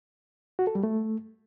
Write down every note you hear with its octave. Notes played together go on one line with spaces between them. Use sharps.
F#4
A4
G3
A3